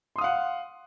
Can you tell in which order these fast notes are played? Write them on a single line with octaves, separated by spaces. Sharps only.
C6 D#6 F5 F#5